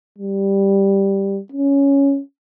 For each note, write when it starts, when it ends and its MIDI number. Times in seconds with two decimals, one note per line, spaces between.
0.18 1.40 55
1.52 2.20 61